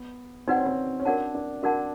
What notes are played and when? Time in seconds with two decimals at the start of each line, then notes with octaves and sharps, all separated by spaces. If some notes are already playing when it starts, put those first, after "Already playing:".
Already playing: B3
0.47 C4 D#4 F#4 B4 D5 F#5
0.57 C#4
0.66 C4
1.00 C#4
1.05 D4 F#4 A#4 D5 F#5 A5
1.35 D4
1.63 D4 F#4 A#4 D5 F#5 A5